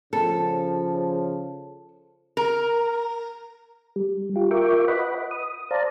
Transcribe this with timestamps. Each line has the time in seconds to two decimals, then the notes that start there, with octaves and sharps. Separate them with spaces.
0.13 C#3 F3 A4
2.37 A#4
3.96 G3
4.36 F4 G4
4.51 F4 A#4 E5 G5 C#6 D6
4.88 B4 D#5 F#5 B5
5.31 D#6
5.71 C5 D5 F5 A5 A#5